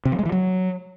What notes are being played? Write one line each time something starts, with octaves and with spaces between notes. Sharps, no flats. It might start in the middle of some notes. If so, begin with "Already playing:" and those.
C3
F3
G#3
E3
F#3